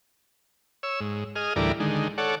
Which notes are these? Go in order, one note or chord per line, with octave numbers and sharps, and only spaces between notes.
C#5 E6
G#2
G#4 D#5 F6
D2 A2 E3 G3 A#4 D5
D3 D#3 G#3
A4 C#5 D5 F#5